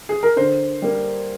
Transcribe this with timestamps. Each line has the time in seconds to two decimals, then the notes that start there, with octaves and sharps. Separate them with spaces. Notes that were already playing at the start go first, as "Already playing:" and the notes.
0.09 G#4
0.23 A#4
0.36 D3 C5
0.82 G3 A#3